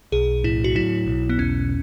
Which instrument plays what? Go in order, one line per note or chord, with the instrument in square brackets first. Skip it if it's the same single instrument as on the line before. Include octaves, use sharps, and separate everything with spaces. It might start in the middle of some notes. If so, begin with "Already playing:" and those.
[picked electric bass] B1 [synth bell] G#4
[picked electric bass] A2 [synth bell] E4
[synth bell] F#4
[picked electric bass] F#3 [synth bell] E4
[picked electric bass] B1
[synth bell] B3
[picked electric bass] E1 [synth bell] C#4